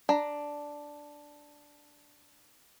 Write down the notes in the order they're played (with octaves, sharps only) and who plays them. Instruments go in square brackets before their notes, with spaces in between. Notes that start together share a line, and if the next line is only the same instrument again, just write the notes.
[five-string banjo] D4 A#5